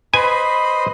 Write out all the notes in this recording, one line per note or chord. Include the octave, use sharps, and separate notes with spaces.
B4 C5 D#5 G#5 B5